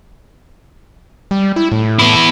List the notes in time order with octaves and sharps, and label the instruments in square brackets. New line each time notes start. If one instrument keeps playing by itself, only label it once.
[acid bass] G3
E4
A2
[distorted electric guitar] B3 E4